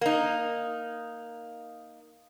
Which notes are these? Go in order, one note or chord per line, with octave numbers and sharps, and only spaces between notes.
A#3 D#4